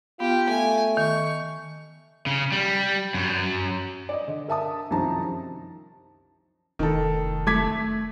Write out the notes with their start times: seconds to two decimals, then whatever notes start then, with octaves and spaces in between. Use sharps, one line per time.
0.20 B3 F4 G4
0.49 A3 G#5
0.97 D#3 C#6
2.26 C#3
2.52 G3
3.14 F#2
4.09 D5 D#5
4.28 D3
4.48 A#4 E5 A5 D#6
4.91 C2 F#2 D#3 F3 A5 A#5
6.79 F1 D#3 A4
7.47 A3 D6 G#6 B6